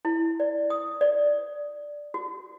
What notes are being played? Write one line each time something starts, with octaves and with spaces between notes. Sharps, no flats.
E4
D5
D#6
D5
F#4